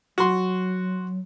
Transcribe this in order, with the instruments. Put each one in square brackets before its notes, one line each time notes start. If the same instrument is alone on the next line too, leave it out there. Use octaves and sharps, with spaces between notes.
[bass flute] F#3 [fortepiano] F#4 C6